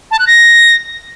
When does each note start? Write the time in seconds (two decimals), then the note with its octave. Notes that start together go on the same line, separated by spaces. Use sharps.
0.11 A5
0.19 F#6
0.27 A#6